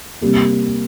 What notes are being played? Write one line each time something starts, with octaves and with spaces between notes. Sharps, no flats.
C3 G3 A#3